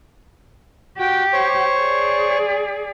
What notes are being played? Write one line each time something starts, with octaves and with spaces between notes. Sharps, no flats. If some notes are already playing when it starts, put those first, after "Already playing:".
F#4 G4 G5
C5 C#5 C#6
G#4 D5